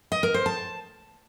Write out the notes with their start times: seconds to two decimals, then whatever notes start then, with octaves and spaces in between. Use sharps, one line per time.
0.12 D#5
0.23 A#4
0.34 C5
0.46 A5